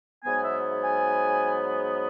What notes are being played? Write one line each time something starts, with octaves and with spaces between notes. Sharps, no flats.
G#2 F#3 B3 G#5
E5
G#5